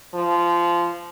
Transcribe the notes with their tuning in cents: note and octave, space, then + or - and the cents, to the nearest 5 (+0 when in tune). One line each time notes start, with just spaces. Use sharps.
F3 -20